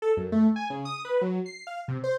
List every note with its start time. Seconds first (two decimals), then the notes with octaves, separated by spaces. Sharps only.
0.02 A4
0.17 F#2
0.32 A3
0.56 G#5
0.70 C#3
0.85 D#6
1.05 B4
1.21 F#3
1.46 C7
1.67 F5
1.88 C3
2.04 C5